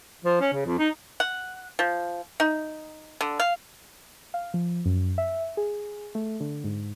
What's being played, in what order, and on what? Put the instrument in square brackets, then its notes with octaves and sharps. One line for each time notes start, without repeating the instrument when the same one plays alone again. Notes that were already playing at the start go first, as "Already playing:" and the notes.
[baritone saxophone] F3
C#4
C#3
F2
D#4
[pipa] F#5
F3
D#4
D3
F5
[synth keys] F5
F3
F#2
E5
G#4
A3
D3
G#2